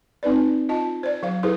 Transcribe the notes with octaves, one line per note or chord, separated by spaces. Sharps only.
C4 D#4 B4 D5
F4 D#5 A5
C5 D5
F#3 C5 F5
E4 G#4 A4 B4 C5